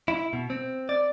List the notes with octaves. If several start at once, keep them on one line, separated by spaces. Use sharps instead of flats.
E4
B2
C4
D5